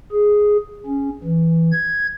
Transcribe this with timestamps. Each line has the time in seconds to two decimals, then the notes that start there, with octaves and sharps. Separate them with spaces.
0.12 G#4
0.86 C#4
1.23 E3
1.72 G#6